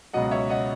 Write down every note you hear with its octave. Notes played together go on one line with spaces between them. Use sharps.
C#2 B2 F#3 D#5 F#5
C#5 E5
D#5 F#5